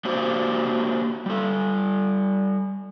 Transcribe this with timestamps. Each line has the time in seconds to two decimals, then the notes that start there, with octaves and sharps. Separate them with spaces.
0.05 A#3 D4 F#4 G4 C5
1.26 G3 A4